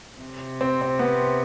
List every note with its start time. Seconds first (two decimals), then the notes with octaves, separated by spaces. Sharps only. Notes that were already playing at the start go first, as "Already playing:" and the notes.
0.21 C3
0.61 C4
0.82 C4
0.99 B3